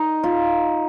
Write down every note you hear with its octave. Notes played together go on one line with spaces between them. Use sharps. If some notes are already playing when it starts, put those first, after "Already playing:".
Already playing: D#4
F4